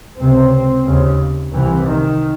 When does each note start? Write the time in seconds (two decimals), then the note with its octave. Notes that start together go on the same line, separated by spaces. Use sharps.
0.20 C#2 C3 C4
0.86 D#2 C#3
1.53 C2 C3 E3
1.86 D#3